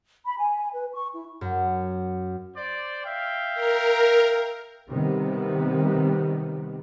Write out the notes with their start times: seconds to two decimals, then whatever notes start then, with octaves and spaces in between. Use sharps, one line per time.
0.25 B5
0.37 G#5
0.73 B4
0.93 C#6
1.13 E4
1.41 F#2
2.55 C5 D5
3.04 E5 F5 G5
3.54 A#4
4.91 C3 D#3 G3 B3